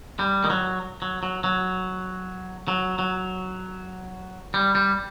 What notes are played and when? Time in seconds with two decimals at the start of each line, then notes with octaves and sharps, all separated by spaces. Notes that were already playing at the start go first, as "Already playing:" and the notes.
0.19 G3
0.44 D#3
0.50 F#3
1.02 F#3
1.23 F#3
1.44 F#3
2.68 F#3
2.99 F#3
4.54 G3
4.75 G3